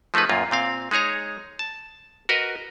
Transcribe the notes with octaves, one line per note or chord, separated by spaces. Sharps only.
F3 A3 D#4 G#4 B4
F#2 A#2 A#3 F4
A#2 C4 F5
G#3 D#4 G#4 C#5 A#5
A5
F#4 A#4 B4 D#5